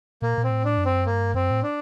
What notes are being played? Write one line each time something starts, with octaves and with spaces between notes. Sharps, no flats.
A#2 A#3
A#2
C4
A2
D4
F#2
C4
G2 A#3
F#2 C4
A2
D4